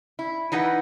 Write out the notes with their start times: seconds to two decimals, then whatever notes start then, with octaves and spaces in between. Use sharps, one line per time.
0.19 E4
0.52 E3 D#4 E4 B4 F#5